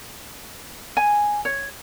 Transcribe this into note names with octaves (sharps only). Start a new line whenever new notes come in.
G#5
C#5